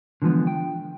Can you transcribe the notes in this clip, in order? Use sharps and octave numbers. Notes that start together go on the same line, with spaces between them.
D3 E3 F3 G#3 B3
G5